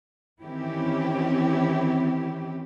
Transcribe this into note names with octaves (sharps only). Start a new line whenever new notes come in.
D#3 E3 C4 C#4 E4 G4